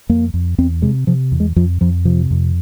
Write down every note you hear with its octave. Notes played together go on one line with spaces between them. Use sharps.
F2 A#3
F2
E2 C4
C3 G#3
C3 F3
E2
G#3
F2 F3
F2 F3
C3 F3
F2